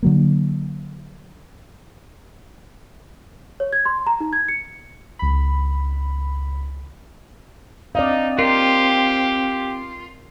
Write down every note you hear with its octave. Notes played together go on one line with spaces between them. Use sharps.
D3 F#3 A#3
C#5
G#6
C6
A#5
D#4
G#6
C#7
C#2 B5
C4 D#4 D5 D#5 F5
F4 G4 A#4